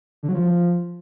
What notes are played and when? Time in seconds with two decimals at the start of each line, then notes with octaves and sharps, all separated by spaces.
0.23 D3
0.29 F#3
0.34 F3